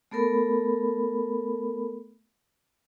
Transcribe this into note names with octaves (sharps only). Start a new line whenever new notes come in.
A3 B3 A4 A#4 B5